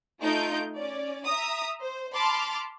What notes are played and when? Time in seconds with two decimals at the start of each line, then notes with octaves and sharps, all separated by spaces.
0.21 A3 D#4 F4 G6 D7
0.76 C#4 D5
1.26 E5 A#5 D#6
1.80 C5
2.14 A5 B5 C6 D6 F6